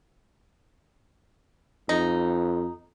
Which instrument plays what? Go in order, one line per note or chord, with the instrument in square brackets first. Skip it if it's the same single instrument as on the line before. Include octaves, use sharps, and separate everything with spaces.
[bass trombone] F2 [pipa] D#4